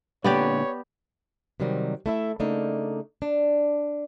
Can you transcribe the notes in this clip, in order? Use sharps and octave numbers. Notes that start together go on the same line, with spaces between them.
A#2 D3 B3 G4 C#5 D5
C3 D#3 F#3 G3 C4
A3 E4 E5
C#3 A3 A#3 D4 D#4
D4